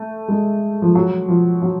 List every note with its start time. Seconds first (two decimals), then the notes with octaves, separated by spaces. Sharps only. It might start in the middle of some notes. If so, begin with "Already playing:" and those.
Already playing: A3
0.28 G#3
0.82 F3
0.95 F#3
1.28 F3
1.62 F#3